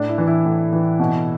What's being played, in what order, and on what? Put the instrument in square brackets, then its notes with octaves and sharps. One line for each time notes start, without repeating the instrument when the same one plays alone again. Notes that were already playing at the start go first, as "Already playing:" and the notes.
Already playing: [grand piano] A2 D4
E4
E3
E4
A2
E3
B2